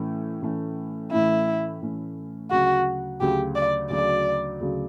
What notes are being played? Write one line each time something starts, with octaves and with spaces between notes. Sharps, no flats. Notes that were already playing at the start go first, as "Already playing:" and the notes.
Already playing: A2 E3 A3 C#4
A2 E3 A3 C#4
A2 E3 A3 C#4 E4
A2 E3 A3 C#4
D2 C#3 F#3 F#4
D2 C#3 F#3 G4
D5
D2 C#3 F#3 D5
D2 C#3 F#3